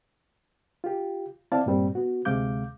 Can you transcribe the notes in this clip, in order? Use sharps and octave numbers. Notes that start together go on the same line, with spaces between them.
F4 G4
C4 E4 D5 F5 A5
G2 A#2 G3 C4
B3 F#4
D2 C3 G#3 F5 D6 G6